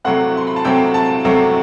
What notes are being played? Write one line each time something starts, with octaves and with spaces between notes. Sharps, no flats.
C3 F#3 A3 C4 F#5
C6
B5
A5
C3 F#3 A3 C4 G5
A5
C3 F#3 A3 C4